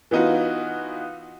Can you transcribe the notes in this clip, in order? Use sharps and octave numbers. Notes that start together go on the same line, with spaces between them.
E3 B3 D#4 F4 F#4